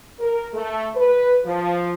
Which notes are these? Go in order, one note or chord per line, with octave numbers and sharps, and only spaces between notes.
A#4
A3
B4
F3